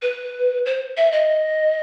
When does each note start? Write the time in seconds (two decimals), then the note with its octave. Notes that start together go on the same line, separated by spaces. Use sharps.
0.02 B4
0.66 C5
0.97 E5
1.12 D#5